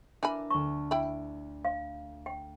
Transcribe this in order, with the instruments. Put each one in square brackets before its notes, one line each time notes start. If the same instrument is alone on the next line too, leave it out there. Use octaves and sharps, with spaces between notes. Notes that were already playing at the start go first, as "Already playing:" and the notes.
[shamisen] E3 G#5 B5 [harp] D4 A#4
[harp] D2 A5 [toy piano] C#6
[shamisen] E4 G5 B5
[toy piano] F5
G5